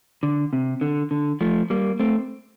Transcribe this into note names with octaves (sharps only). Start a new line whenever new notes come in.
D3
C3
D3
D3
F3 A3
G3 A#3
A3 C4